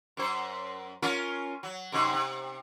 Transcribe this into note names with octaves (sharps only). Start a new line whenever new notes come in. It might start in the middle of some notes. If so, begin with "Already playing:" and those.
F#2 C5
C#4 F4 A#4
F#3
F#2 C3 D#4
C3